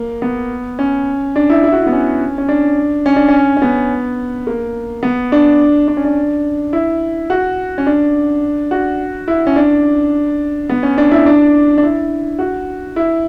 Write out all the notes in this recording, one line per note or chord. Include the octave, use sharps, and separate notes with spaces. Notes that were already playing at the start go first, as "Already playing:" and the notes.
Already playing: A#3
B3
C#4
D4
E4
E4
F#4
E4
B3
C#4
C#4
D4
C#4
D4
C#4
C#4
B3
A#3
B3
D4
D4
C#4
D4
E4
F#4
C#4
D4
F#4
E4
C#4
D4
B3
C#4
D4
E4
D4
D4
E4
F#4
E4